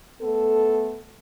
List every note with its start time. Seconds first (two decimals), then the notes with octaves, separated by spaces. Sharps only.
0.21 A3 B3 A4